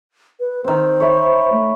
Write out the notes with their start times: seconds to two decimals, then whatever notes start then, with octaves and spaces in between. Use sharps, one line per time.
0.40 B4
0.64 D#3 C4 C5
1.00 C#5 E5 B5
1.52 A3